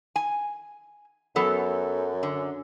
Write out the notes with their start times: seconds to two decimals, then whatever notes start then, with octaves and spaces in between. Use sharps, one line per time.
0.16 G#5
1.36 F#2 F#3 B3 A4
2.23 D3